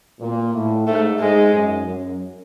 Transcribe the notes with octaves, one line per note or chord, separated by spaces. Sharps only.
A#2
A2
G#2 A3
G#2 G#3
F#2
F#2